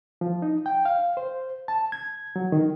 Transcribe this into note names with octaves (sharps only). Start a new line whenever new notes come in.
F3
D#4
G5
F5
C5
A5
G#6
F#3
D#3